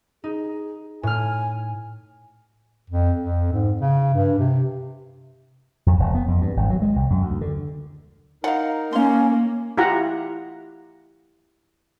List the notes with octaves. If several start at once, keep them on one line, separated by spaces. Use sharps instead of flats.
D#4 G#4
A2 G#5 F6
F2
F2
G#2
C#3
G2
C3
F2
E1
B3
F2
G2
G#1
F#3
G#3
C2
F#2
D2
D3
D#4 A#4 F5 F#5
A#3 C#4 F5 C6
E4 F4 G4 F5 F#5 A#5